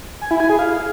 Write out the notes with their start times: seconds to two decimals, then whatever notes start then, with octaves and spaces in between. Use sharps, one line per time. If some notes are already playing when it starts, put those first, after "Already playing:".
0.21 G#5
0.31 E4
0.40 G#5
0.50 G#4
0.59 F5